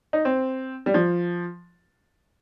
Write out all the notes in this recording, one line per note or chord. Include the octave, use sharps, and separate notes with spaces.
D#4
C4
G3
F3